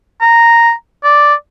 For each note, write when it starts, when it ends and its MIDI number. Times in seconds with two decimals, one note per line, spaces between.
0.21 0.71 82
1.04 1.34 74